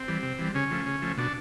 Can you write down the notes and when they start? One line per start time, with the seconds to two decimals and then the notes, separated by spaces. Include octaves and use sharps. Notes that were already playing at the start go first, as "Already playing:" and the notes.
Already playing: C4
0.08 E3 G3
0.23 C3
0.39 E3 G3
0.54 C#3 C#4
0.71 F3 A3
0.86 C#3
1.02 F3 A3
1.18 B2 D4